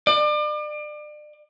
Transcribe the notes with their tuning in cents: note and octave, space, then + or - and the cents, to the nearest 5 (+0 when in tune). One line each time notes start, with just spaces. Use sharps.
D5 +35